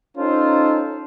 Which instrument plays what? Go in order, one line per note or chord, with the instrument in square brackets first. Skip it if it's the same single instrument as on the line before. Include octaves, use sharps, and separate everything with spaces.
[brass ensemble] C#4 D#4 F4 A4 C5